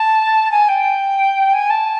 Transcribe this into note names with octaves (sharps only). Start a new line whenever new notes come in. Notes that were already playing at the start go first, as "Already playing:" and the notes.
Already playing: A5
G#5
G5
G#5
A5